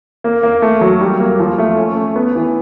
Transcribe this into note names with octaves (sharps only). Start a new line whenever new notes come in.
A#3
A#3
A3
F#3
G3
A#3
F3
A3
C#4
A3
B3
E3